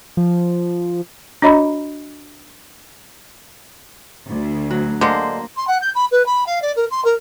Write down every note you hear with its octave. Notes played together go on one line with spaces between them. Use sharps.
F3
D4 F#4 C#5 D#5 A#5 B5
D2
F#3
D3 G#3 A#3 C5
C6
F#5
G6
B5
B4
B5
F5
D5
A#4
C6
A#4